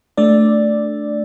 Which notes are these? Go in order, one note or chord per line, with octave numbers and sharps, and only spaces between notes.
A3 D4 D5